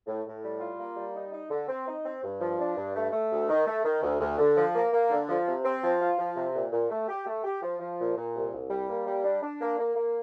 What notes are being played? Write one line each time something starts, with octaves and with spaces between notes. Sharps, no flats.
A2
A2
G3
F4
A#3
G3
D#4
D#4
D3
C4
D#4
C4
G2
F3
D4
G2
A3
A3
D2
D#3
A3
D#3
D2
D2
D3
F3
A#3
A#3
D3
F3
C3
C4
F3
F4
F3
C3
A#2
A#2
A3
G4
A3
G4
F3
F3
A#2
A#2
C2
C2
G3
A#3
G3
D4
D4
A#3
A#3
A#3